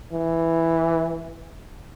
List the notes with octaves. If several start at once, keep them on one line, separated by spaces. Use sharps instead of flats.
E3